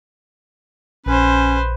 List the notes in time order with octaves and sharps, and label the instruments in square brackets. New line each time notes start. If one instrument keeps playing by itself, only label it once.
[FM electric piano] A#1 [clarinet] C#4 [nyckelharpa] B4 C5